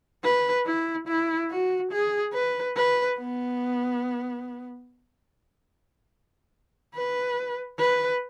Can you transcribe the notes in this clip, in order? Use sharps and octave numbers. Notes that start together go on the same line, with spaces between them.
B4
E4
E4
F#4
G#4
B4
B4
B3
B4
B4